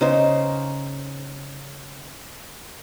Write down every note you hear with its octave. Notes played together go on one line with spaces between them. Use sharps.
C#3 D#4 C5